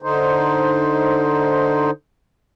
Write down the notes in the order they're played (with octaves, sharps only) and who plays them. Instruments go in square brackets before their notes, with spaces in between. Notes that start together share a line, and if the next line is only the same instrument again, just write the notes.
[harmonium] D3 D#4 C5